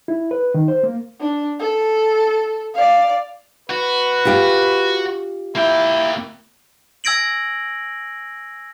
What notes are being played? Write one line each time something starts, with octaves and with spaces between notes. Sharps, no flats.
E4
B4
D#3
C5
A#3
D4
A4
D5 F5
F#4 B4
F4 G4
A#3 E4 G5
G#5 E6 G#6 A#6 D7 F#7